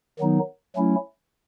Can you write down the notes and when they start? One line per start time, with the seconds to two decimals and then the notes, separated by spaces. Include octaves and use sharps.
0.19 D#3 F#3 B3 D#4
0.76 F#3 A3 C#4 E4